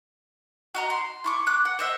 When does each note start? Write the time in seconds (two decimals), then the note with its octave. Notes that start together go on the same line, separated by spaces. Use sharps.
0.75 F#4 D#5 A#5
0.90 C6
1.24 E4 C#6 D6
1.46 D6 F#6
1.65 F#5
1.79 C5 D#5 E5